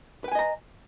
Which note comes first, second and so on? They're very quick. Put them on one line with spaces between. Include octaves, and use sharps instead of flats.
B4 G5 G#5 D#5 A#5